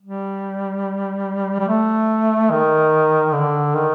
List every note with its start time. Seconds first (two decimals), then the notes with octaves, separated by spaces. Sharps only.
0.02 G3
1.60 G3
1.68 A3
2.51 D#3
3.34 D3
3.75 D#3